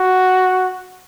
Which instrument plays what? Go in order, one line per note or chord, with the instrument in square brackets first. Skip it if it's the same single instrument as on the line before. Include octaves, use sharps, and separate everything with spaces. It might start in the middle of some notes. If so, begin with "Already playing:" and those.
Already playing: [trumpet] F#4